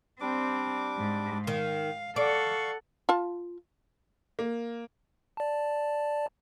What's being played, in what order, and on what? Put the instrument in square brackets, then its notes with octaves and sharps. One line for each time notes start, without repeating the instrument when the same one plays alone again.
[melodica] G3 D4 D6 [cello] C4
[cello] G#2
[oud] D#3 [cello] F5
[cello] A4 F#5 [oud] D5 [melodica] F5 C#6
[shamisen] F4 A5
[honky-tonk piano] A#3
[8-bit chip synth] D5 A5